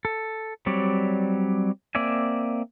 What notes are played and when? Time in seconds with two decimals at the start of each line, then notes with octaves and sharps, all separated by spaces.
0.05 A4
0.66 F#3 G3 C4 C#5 D5
1.95 A#3 C4 D5 E5 G#5